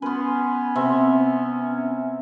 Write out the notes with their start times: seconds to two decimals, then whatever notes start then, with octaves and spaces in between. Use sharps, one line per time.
0.02 B3 C#4 B4 C6
0.75 C3 C4 E5